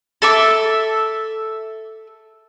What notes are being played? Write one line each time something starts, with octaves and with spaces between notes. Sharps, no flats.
A4 E5 D6